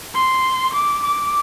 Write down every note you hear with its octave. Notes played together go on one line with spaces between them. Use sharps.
C6
D6
D6